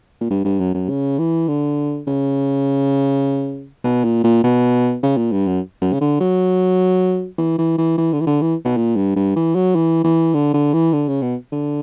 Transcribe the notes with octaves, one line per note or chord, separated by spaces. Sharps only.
A#2
G2
G2
F#2
F#2
C#3
E3
D3
C#3
B2
A#2
A#2
B2
C#3
A#2
G2
F#2
F#2
C#3
D3
F#3
E3
E3
E3
E3
D3
E3
D3
E3
B2
A#2
G2
G2
E3
F#3
E3
E3
D3
D3
E3
D3
C#3
B2
D3